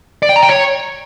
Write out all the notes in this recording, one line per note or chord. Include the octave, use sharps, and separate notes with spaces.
D5
G5
A#5
G5
C#5